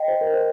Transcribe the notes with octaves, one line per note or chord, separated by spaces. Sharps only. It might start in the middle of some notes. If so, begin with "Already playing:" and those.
Already playing: D#5 G5
C5
A#4
C5